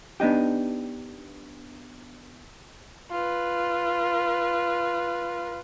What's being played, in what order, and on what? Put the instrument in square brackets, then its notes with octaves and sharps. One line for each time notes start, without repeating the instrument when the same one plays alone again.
[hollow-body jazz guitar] B3 D4 D#4 G4
[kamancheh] F4 B4